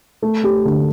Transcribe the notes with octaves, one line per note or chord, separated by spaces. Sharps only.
A3
G4
D3